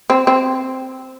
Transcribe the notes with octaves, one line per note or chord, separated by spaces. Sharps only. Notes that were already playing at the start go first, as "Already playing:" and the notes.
C4
C4